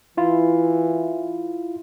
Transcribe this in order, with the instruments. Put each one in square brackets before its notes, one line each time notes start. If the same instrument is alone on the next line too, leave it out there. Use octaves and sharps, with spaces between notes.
[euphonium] E3 [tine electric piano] E4 F4